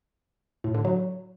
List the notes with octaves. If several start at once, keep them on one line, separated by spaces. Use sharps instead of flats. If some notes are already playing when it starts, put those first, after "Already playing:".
A2
D3
F#3